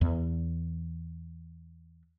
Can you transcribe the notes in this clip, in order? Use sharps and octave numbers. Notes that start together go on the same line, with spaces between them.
E2 E3